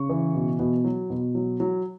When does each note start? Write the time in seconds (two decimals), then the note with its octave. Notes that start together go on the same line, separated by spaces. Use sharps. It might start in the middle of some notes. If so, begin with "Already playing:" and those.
Already playing: C#3 C#6
0.09 E3
0.34 B2
0.59 B2
0.84 F#3
1.10 B2
1.35 F#3
1.60 F#3